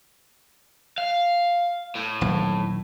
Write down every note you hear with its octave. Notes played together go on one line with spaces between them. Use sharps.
F5
A2
D#1 B1 E2